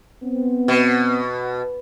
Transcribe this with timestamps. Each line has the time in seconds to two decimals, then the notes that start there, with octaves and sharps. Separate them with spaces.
0.23 B3 C4
0.68 B2